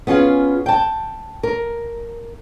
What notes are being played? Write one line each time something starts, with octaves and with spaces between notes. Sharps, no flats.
B3 C#4 F4 G#4
G5 A5
A#4